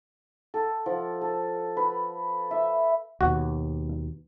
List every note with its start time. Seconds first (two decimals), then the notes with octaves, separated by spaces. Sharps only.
0.54 A4
0.86 F3
1.21 A4
1.77 B4
2.51 E5
3.21 D#2 B2 F#4